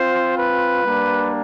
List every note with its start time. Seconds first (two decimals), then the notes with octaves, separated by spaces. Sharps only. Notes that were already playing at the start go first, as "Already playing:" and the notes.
Already playing: C4 F4 C5
0.38 B4
0.83 G3 A#3 D4